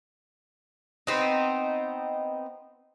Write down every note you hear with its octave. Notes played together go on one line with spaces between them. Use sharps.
B3 C4 D#4